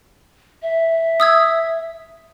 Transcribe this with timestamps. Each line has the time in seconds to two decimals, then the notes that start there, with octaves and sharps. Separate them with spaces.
0.62 E5
1.20 D#6 E6 G#6